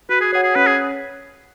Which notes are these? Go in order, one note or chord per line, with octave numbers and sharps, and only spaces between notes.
F#4 B4
G#4
G#4 C#5 F#5
G#4
C#4 B4
G#4